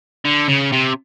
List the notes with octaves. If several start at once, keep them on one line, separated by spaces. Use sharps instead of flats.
D3
C#3
C3